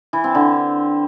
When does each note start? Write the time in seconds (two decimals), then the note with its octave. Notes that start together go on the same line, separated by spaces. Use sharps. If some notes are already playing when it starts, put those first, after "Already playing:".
0.13 E3
0.24 C4
0.35 D3